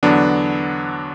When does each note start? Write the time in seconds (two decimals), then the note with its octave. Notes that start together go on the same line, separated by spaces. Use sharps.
0.03 E2 D3 F#3 B3 D4